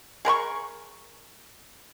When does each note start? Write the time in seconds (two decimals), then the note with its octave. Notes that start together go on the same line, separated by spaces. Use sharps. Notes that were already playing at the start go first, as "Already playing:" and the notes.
0.25 G#4 A#4 B5 C#6